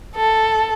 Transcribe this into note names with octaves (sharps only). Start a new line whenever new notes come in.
A4